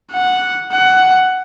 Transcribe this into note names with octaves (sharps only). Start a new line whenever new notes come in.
F#5
F#5